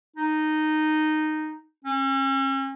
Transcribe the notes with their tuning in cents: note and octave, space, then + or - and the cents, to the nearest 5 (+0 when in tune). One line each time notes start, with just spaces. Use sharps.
D#4 -10
C#4 -40